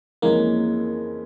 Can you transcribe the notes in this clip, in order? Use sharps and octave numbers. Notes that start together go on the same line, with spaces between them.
F2 E3 G#3 A#3 C#4